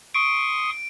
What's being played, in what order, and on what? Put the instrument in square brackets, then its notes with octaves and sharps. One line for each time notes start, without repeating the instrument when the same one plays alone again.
[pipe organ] C6 C#6 D#6 [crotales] D7